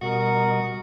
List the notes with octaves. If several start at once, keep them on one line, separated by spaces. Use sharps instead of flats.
B2 G3 F#4 A#4 D#5